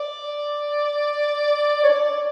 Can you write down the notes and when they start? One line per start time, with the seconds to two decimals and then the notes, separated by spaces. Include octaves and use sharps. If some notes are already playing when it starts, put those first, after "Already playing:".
Already playing: D5
1.84 C#5
1.89 D5